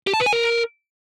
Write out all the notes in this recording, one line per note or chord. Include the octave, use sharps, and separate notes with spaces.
G4
A5
B4
G#5
A#4